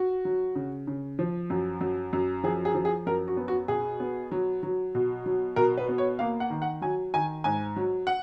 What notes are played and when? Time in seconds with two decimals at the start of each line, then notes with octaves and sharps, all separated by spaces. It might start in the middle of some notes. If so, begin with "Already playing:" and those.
Already playing: F#4
0.25 F#3
0.55 C#3
0.87 C#3
1.19 F3
1.50 F#2
1.81 F#2
2.13 F#2
2.43 F3 G#4
2.65 G#4
2.74 F3
2.85 G#4
3.06 F#2 A#4
3.28 F#4
3.37 B3
3.48 F#4
3.68 B2 G#4
4.00 B3
4.32 F#3
4.63 F#3
4.95 B2
5.26 F#3
5.56 B2 A#4
5.78 B4
5.89 B3
5.98 C#5
6.19 A#3 F5
6.40 F#5
6.50 D#3
6.62 F#5
6.82 F#3 G#5
7.14 D#3 G#5
7.44 G#2 G#5
7.76 F#3
8.07 F#5